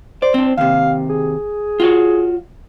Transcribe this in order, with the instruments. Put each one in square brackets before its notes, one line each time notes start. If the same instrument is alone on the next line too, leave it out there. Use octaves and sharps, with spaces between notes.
[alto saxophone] C5 [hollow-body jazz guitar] D5
[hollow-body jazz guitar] C4 D4
[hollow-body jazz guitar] D#2 C3 [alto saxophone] F5
[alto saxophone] G#4
[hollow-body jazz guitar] F4 F#4 C#5